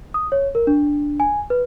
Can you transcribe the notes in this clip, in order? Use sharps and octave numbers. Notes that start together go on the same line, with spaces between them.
D#6
C#5
A#4
D4
G#5
B4